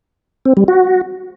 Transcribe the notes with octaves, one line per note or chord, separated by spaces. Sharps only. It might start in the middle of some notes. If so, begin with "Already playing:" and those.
C4
G3
F#4